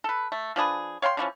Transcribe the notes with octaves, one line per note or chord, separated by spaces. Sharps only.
A4 B4
A3
F3 D4 G#4 B4
C#5 F5 G5 C6
D3 E3 F3 C#4